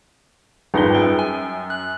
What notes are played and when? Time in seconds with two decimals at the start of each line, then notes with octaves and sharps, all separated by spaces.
0.74 G#1 F2 G3 D#4 F4 G#4 B4 G7
0.95 F#2 G5
1.19 G#5
1.70 F#6